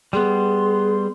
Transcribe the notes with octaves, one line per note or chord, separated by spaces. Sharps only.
G3 B3 G#4 C6